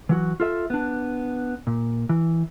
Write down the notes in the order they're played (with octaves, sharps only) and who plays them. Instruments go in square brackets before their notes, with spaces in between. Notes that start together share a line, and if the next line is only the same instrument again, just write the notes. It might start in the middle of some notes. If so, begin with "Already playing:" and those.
[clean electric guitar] E3 F#3 F#4
F4 A4 E5
B3 D4
A#2
E3